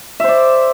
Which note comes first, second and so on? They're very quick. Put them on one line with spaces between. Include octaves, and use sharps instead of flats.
E5 C5 D5